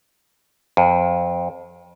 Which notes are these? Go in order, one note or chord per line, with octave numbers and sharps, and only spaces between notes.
F2